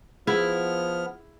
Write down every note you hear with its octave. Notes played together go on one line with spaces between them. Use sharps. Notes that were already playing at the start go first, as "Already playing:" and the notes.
F3 B3 E4 G#4 F6